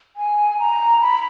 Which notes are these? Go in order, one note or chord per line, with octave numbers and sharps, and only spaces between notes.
G#5
A#5
B5